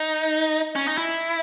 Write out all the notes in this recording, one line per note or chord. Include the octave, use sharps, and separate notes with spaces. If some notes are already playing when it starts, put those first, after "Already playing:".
Already playing: D#4
C#4
D#4
E4